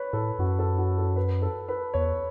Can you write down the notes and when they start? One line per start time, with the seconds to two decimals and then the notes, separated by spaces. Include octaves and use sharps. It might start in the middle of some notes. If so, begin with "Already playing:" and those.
Already playing: B4 C#5
0.13 A2 A4
0.39 F#2 F#4
0.59 A4
0.78 F#4
0.98 A4
1.16 B4
1.42 A4
1.68 B4
1.94 E2 C#5